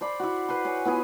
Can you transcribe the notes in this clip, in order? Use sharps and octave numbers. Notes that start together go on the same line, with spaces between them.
C5 D5 B5
E4 F#4
B4 C5 C6
G#4 C#5
B3 E4 F4 G#4